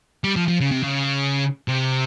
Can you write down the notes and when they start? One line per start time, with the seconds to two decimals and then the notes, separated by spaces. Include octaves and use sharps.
0.24 G3
0.36 F3
0.48 F3
0.60 C#3
0.72 C3
0.83 C#3
1.68 C3